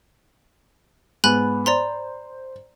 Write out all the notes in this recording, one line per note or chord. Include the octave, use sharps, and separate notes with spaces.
G#2 B3 G#5 B5 F#6
C5 D5 A#5 C6